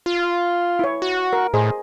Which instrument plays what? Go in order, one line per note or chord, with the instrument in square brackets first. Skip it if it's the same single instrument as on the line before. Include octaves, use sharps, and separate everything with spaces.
[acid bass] F4
[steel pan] E4 C#5
[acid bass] F#4
[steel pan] A#4
[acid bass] A2 [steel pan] G#4 C5 D#5